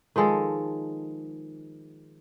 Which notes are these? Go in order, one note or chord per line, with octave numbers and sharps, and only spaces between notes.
D#3 F3 G#3 A4